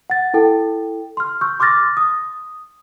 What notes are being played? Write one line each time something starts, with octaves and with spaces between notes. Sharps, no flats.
F#5 A6
E4 A4 G5
C6 F6
C#6 E6 G6
C6 D6 E6 F6 A6 A#6
D#6